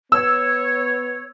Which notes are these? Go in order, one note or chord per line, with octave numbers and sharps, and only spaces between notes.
B3 C#5 E6